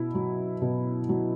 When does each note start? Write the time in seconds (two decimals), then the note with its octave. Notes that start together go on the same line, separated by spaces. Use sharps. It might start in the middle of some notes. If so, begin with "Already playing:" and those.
Already playing: B2 E4
0.15 F#3
0.62 B2
1.09 F#3